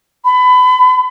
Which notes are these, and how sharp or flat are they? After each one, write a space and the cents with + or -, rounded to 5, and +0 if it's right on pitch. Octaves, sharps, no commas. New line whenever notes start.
B5 +25